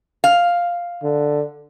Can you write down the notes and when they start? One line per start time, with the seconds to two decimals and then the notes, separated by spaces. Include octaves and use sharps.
0.24 F5
1.03 D3